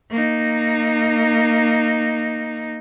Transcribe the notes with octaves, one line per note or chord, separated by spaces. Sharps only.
A#3 D#4